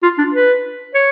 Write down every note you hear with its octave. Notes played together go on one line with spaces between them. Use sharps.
F4
D4
B4
C#5